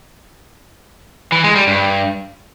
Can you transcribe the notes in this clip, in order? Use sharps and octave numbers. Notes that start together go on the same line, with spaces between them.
E3
G#3
G3
G2